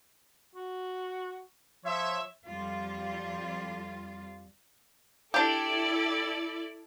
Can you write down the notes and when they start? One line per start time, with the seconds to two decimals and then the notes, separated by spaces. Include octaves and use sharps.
0.55 F#4
1.85 F3 C#5 E5
2.47 F2 G3 F4
5.34 D4 E4 G4 A4 D5